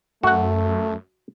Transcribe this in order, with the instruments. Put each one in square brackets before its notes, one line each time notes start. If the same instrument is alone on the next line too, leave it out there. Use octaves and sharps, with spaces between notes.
[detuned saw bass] F#2 [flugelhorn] A3 [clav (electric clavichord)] F#4 F#5